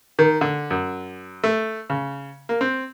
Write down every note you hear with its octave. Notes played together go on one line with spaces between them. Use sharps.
D#3
D3
F#2
A3
C#3
A#3
C4